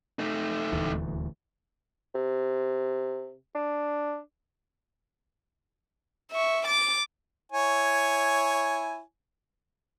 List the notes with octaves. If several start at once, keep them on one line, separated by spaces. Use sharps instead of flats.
A3 D#4
D#1 D2 E3
C3
D4
E5 C#6
D6 A6
E4 C#5 G#5